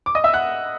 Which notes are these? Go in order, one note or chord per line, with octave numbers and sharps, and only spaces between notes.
D6
D#5 D#6
E5 E6
F#5 F#6